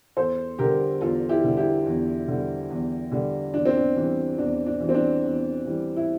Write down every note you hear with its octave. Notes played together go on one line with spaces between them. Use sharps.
E2 A4 C5
D3 G3 G4 A#4
E2 F4 A4
E4 G4
D3 G3
E4 G4
E2
D3 G3
E2
D3 G3
E2 D4
C4
D4
E3 G3 D4
E2 D4
D4
E3 G3
C4
D4
E2
E3 G3
E4